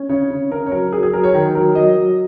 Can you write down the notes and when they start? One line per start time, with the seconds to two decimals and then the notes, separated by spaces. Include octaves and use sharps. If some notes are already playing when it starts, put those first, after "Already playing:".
Already playing: C#4
0.09 C#3 C#5
0.30 C#3
0.51 C#3 A#4
0.66 C#5
0.71 F#3 A#4
0.92 F#3 G#4
1.03 G#4
1.13 F#3 A#4
1.24 C#5
1.34 D#3 A#4
1.55 F#3 A#4
1.75 F#3 D#5
1.97 F#3